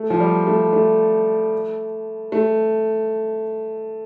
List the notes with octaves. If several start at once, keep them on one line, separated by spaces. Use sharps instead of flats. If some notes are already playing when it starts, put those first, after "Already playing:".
Already playing: A3
F3
G3
A3
A3
A3